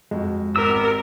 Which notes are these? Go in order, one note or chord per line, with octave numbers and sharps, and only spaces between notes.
F2 G#3 F#4
G#1 B3 G4 A#4 E6